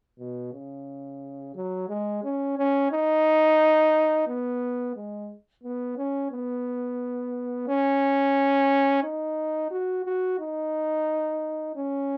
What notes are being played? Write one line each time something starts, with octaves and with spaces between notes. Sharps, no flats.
B2
C#3
F#3
G#3
C#4
C#4
D#4
B3
G#3
B3
C#4
B3
C#4
D#4
F#4
F#4
D#4
C#4